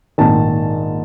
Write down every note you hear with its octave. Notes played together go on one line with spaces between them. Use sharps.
A#1 G#2 D#3 A5